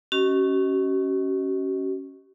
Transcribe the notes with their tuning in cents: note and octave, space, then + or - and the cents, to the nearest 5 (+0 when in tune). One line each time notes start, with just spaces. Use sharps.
C#4 -5 F#4 +45 D#5 +10